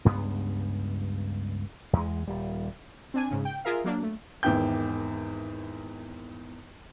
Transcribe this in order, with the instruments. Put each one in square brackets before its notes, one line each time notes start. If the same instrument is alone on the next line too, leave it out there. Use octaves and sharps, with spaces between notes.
[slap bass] C#2 G2 B3
E2 G#3
D#1 G3
[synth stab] C4 D4 G#5
G#2 C#3
G5
F4 G#4 A#4 E5 F5
F#3 A#3 D4
A3
[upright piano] G#1 E2 D#3 E4 G5 G6